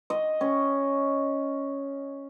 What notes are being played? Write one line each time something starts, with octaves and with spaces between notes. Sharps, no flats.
D#5
C#4